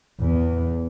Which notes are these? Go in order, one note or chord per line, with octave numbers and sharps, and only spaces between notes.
E2